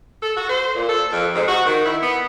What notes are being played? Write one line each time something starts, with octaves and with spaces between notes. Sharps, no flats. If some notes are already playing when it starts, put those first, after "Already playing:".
A4
F#4
C5
A#2
A4
F2
G#2
F#4
D#3
E4
B3